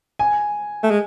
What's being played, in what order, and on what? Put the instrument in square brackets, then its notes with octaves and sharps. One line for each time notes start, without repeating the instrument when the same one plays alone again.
[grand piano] G#5
[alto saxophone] A3
G#3